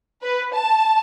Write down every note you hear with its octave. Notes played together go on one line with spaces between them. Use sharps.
B4
A5